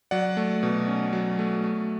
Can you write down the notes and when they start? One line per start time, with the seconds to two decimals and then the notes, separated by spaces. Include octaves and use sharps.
0.11 F#3 D5 F#5
0.37 A3
0.63 B2
0.88 C#4
1.13 F#3
1.39 A3
1.64 A3